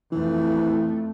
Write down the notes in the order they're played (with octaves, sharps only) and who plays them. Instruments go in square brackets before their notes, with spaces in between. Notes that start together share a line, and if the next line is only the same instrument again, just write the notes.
[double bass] F2 A3 [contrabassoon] E3